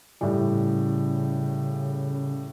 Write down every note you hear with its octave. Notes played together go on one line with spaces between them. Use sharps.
A2 C#3 G3